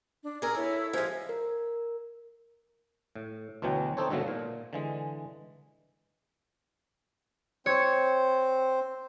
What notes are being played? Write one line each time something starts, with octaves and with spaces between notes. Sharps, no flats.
D4
G#4 A#4 E6 G#6
E4 A4 C#5 E6
F3 G#3 E5 G#5 G#6
A#4
A2
D2 B2 E3 F#3 G5
C4 D#4 A4 C5 C#5
G#2 B2 D3 F#3 A3 A#3
A#2
D3 E3 G#3
C4 C5 C#5